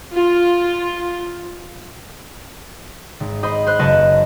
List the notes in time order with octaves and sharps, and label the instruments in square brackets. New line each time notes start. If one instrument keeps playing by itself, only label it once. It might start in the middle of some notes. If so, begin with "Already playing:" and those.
[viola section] F4
[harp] G#1
C5 D#5 B5 D#6
C5 B5 F#6
F#1 B4 D#5 A5 C#6